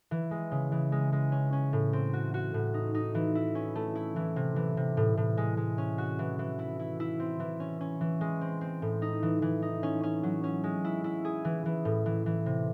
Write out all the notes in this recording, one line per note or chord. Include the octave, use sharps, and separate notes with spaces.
E3
G#3
C#3
E3
G#3
G#3
C#4
C#4
A2
C4
F#4
F#4
A2
D#4
D#4
E3
E4
C#4
A3
E4
E3
C3
E3
C3
A2
A2
G#3
G#3
C#4
F#4
E3
E3
E4
E4
E4
C4
E3
C#4
C#4
E3
G#3
C4
C4
A2
D#4
E3
E3
D#4
C#4
C#4
F#3
C#4
G#3
E4
E4
G#4
E3
E3
A2
E3
E3
C3